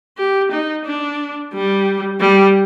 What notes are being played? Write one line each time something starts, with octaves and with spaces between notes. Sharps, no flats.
G4
D#4
D4
G3
G3